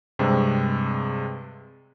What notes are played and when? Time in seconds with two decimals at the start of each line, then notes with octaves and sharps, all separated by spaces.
0.19 G2 C3 G#3 C4